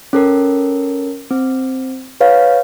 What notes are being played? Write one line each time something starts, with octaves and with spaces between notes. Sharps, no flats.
C#4 A4 A#4
C4
B4 C#5 F5